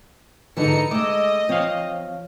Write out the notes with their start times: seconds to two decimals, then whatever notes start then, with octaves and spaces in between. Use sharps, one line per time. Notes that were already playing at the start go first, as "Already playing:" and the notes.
0.57 G#2 D3 E3 F3 D4 D#4 C#7
0.91 G#3 A3 D#5 D6 E6
1.49 F3 C4 C#5 F5